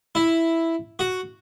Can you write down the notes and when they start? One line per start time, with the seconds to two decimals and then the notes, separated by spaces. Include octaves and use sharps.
0.15 E4
0.99 F#4